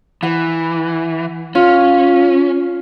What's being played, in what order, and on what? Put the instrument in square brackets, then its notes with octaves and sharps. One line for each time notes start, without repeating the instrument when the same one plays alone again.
[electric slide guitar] E3 [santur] F#5
[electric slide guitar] C#4 [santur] F4